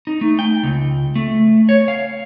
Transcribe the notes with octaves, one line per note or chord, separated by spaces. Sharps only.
D#4
A3
G5
C#2
A3
C#5
F5